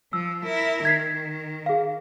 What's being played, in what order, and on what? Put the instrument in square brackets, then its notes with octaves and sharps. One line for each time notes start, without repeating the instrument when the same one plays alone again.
[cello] F3 [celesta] E6
[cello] E4 A#4
[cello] D#3 [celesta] G#6 B6 C7
[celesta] G#4 F5